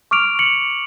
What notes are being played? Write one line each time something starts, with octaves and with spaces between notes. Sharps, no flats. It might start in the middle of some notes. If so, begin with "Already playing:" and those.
C#6 D6 F6 D7 F7
C#7 F#7